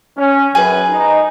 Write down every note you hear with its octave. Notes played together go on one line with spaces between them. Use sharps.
C#4
F#2 G#4 B4
D#4